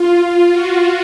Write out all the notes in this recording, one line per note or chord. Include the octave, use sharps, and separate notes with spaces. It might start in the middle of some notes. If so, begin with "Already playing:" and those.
Already playing: F4
F#4